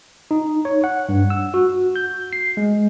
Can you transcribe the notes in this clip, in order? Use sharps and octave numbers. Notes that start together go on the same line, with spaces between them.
D#4
C#5
F#5
G2
E6
F#4
G6
C7
G#3